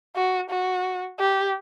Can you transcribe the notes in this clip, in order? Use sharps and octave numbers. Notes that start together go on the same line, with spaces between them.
F#4
F#4
G4